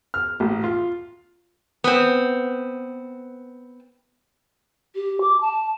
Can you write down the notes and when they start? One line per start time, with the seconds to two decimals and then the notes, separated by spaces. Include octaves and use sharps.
0.14 F6
0.40 A1
0.64 F4
1.84 B3 C4
4.96 G4
5.21 D6
5.41 A5